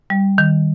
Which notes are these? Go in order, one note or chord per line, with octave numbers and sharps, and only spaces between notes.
G3
D#3